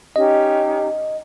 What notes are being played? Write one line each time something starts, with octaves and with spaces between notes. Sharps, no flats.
C#4 D#4 G4 D#5